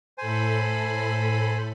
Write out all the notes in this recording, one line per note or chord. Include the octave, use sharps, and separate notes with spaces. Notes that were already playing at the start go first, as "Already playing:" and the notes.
A2 A4 C5 G#5 B5